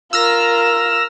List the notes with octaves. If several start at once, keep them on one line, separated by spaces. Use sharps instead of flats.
F4 A#4 E6 F6 A#6